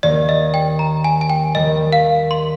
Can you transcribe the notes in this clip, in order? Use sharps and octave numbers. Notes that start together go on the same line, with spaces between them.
D#2 D#3 A#3 D#4 D5
D#5
G5
A#5
G#5
G#5
G5
D#2 D#3 G3 D#5
F5
C6